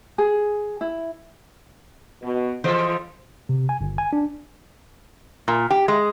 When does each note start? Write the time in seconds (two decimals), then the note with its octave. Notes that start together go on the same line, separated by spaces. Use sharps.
0.18 G#4
0.81 E4
2.21 B2
2.64 E3 F4 G#4 A4 C5 D#5
3.49 C3
3.69 G#5
3.81 G1
3.98 G#5
4.13 D4
5.48 A#2
5.71 G4
5.88 G#3